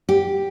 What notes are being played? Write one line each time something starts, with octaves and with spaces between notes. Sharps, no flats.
G4